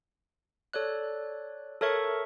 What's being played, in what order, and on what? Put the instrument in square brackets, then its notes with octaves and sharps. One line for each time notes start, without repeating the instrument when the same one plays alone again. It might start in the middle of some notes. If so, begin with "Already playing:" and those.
[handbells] A4 C#5 D5 F#6
A4 A#4 C#5 E5 C#6